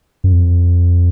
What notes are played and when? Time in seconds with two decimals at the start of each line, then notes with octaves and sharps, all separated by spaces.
0.24 F#2
0.33 F2